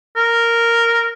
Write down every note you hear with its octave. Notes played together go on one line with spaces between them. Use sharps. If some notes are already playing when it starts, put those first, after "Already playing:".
A#4